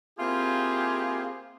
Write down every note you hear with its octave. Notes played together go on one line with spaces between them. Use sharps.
A#3 C4 E4 F4 G4 G#4